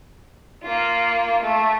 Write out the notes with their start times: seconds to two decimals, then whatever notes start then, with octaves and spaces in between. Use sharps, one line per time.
0.63 A#3 F4
1.42 A3